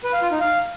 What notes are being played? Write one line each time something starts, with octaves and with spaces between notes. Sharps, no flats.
B4
F5
F4
D#4
F5